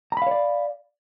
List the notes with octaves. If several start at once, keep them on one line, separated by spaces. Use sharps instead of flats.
C#5 D5 F5 A#5 B5